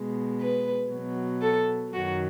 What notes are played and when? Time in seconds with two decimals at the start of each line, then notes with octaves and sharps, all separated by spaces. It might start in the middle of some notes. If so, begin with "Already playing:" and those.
Already playing: B2 G#3
0.41 B4
0.92 B2 F#3
1.42 A4
1.93 F#2 D#3 F#3 F#4